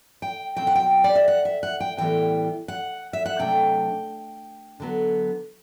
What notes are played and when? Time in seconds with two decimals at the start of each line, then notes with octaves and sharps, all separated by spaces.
0.22 G5
0.56 B2 F#3 C4 G5
0.67 F#5
0.75 G5
1.04 D5
1.15 E5
1.28 F#5
1.45 E5
1.63 F#5
1.80 G5
1.98 A2 E3 G3 B3 G5
2.68 F#5
3.13 E5
3.26 F#5
3.39 C3 F#3 A3 D4 G5
4.80 D3 F#3 B3